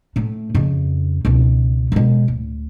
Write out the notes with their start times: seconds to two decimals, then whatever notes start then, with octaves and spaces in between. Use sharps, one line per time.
0.16 A2 A3
0.55 F2 C#3
1.25 C#2 B2
1.92 B2 G#3
2.28 D1